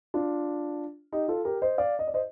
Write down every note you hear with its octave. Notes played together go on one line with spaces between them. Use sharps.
D4 F4
D#4 G4
F4 A4
G4 A#4
C5 D#5
D5 F5
D#5
D5
C5 D#5